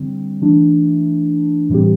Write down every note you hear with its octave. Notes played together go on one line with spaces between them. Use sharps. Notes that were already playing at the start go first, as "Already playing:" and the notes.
Already playing: D3 G3 C4
E3 A3 D4
A2 E3 G3 C4 G4